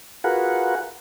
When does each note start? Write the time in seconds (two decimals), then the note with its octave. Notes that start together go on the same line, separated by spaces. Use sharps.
0.24 F4 F#4 G#4 A#4 B4 F#5